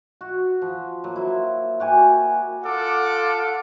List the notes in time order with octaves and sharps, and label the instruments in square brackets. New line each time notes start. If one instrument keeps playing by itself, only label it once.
[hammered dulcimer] F#4
F3
F#3 A#3
E4 C5
F#4 G4 G#5
[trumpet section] F4 A4 F#5 D6